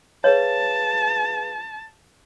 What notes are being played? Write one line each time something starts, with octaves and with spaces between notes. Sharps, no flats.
G#4 B4 C#5 F5 A5